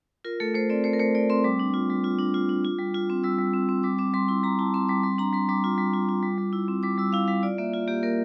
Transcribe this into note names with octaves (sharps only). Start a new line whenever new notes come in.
F4 A#4
A3 A4
A3 C5
C4 D5
A3 C5
A#4
A3 C5
A3 D5
C4 C6
G3 D6
D4
F4
G3
F4
D4
F4
D4
F4
G3
F4
C4
G3 E6
G3
C4
C4
G3 D6
C4 D6
G3 C6
E4 C6
G3 A#5
E4 A5
C4 C6
G3 D6
G3 C6
D4 A#5
G3 C6
G3 D6
F4
G3
F4
F4
G3
G3
E4
C4
G3 D6
G3 E6
E4 F5
G3 F5
F4 D5
A#3 E5
F4
A#3 G4
A#3 A#4